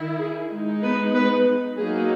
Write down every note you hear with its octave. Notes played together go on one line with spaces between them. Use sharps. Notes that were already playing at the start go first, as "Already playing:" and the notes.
Already playing: D#3 E4
G#4
G#3 D#4
B3 B4
B3 B4
F#3 A#3 D#4 G#4